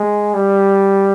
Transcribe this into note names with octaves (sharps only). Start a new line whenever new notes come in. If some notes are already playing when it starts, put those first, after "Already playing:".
Already playing: G#3
G3